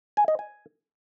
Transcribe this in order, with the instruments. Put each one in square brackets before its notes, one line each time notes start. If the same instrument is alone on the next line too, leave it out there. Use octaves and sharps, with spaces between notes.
[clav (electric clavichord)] G#5
D#5
G#5